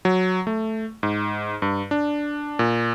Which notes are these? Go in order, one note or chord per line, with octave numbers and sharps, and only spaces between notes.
F#3
A3
G#2
G2
D4
A#2